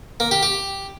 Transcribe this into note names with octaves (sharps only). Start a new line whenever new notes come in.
A#3
G4
G4